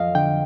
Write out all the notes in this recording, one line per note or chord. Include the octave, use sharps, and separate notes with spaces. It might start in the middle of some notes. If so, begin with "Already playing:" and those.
Already playing: F2 F3 D#5 F5
D3 G5